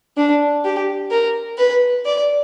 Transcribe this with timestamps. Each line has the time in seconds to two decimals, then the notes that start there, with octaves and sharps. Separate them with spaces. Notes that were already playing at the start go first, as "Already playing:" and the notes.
0.17 D4
0.65 G4
1.11 A#4
1.58 B4
2.06 D5